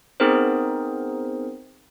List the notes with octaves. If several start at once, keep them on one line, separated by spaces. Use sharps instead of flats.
B3 C4 D#4 G#4 A#4 C5